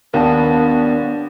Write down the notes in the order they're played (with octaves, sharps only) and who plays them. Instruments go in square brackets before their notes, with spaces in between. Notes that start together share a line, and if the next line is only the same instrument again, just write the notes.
[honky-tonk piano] D#2 [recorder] B3 [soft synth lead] D4 [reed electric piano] A#4 G5 A5